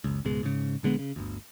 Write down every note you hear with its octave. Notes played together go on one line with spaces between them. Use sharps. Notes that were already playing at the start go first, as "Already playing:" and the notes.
F#1 C#2
C#2 G#2 B2 G#3
G#2 C#3
A#1 D3 G#3 B3
C#3
G1 D2